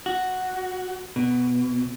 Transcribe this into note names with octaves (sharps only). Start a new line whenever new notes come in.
F#4
B2